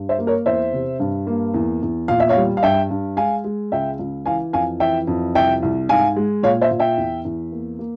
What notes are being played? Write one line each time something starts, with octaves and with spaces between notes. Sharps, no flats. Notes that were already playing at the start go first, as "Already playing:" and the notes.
Already playing: G2
C5 E5
A#3
A#4 C#5
E2 C5 E5
C3
G2
A#3
E2
E2
A#2 F5
E5
C#5 F5
G3
F5
G2 E5 G5
G2
G#3 F5 G#5
G#3
C#2 E5 G5
C#2
E3 F5 G#5
F2 F5 G#5
E3 E5 G5
F2
C2 E5 G5
C2
G#2 F5 G#5
G#3
A#2 C#5 F5
C5 E5
A#2
E5 G5
E2
E2
A#3
A#3